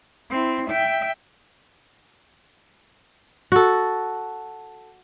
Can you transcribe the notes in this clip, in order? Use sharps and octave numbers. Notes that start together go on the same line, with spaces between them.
C4 E4
E5 G5
F#4 A4